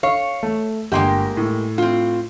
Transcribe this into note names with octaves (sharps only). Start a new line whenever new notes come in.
C#5 F5
A3
G1 G#3 A#3 G4 G5 C6
A2
C4 F4